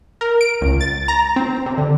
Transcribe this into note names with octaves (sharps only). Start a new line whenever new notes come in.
A#4
D7
C#2
A6
A#5
C4
C3
D3